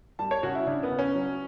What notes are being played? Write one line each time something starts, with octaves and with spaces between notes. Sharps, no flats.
G3 A5
C#5
C#3 F#4
E4
C#3 D4
B3
C#3
C#4
F#3